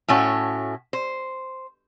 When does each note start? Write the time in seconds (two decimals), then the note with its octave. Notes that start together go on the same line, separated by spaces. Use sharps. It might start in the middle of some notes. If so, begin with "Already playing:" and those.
0.08 A2 A3 C#4 F#4
0.93 C5